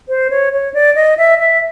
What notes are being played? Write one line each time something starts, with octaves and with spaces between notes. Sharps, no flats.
C5
C#5
C#5
D5
D#5
E5
E5